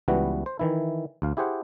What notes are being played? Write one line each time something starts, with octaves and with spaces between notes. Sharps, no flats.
C#2 E3 G3 B3 F#4
C5
D#3 E3 E4
D2 F5
E4 G4 G#4 C5 F#5